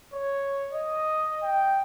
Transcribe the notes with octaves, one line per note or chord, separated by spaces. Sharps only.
C#5
D#5
G5